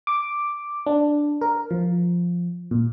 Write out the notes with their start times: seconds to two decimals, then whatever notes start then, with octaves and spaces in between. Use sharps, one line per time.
0.07 D6
0.86 D4
1.41 A#4
1.71 F3
2.71 A#2